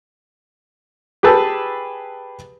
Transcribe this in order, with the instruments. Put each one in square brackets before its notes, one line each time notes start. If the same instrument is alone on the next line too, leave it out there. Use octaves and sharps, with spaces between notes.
[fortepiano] G4 G#4 B4 A5 E6